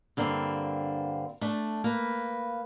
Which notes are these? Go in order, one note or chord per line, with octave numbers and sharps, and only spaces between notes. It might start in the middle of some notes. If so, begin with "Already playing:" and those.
G2 D3 A#3 C4
A3 D4
A#3 B4